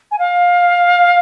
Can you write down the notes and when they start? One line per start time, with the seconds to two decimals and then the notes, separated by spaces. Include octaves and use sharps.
0.11 G#5
0.18 F5